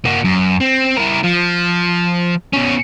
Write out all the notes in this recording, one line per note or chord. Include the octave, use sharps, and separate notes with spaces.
A#3 F#4
F#2
C4
E4 A#4
F3
B2 C#4